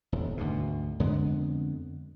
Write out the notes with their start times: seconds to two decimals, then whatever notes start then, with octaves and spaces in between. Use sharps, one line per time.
0.12 D#1 E2
0.37 D2 G#2 B2
1.00 F2 D3 G#3 B3